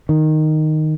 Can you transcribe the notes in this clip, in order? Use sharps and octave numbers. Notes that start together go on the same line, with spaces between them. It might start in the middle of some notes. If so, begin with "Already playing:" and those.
D#3